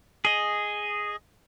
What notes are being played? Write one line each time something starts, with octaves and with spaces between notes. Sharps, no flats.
G#4 D#5